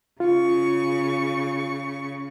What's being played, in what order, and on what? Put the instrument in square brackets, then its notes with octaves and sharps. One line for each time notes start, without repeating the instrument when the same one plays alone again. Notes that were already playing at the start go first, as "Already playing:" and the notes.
[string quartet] C#3 C#6 [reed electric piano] F4